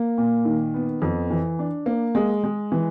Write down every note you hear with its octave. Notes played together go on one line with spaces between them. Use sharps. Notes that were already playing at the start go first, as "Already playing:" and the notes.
Already playing: A#3
A#2
D#3
B3
F2
E3
D4
A#3
G#3
G#3
E3